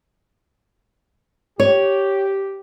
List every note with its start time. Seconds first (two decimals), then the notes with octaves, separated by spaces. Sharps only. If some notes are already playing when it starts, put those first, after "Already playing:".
1.60 G4 C#5